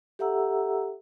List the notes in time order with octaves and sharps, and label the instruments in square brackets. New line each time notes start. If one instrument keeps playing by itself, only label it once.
[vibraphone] G4 A4 E5 F#5 A#5 E6